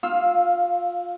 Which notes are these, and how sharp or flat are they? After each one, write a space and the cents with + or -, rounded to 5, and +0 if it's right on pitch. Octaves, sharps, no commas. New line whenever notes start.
F4 +20 F5 +0 E6 +0